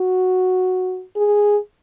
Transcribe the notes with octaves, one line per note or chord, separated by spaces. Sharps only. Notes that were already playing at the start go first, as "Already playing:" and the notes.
Already playing: F#4
G#4